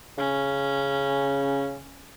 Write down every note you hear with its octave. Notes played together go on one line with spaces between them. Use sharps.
C#3 C#4